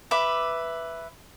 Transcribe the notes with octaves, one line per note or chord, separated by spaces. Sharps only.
B4 E5 D6